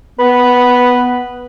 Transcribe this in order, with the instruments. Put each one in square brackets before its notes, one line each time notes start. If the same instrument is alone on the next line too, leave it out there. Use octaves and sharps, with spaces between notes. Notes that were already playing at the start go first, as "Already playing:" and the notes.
[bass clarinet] B3 [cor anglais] B4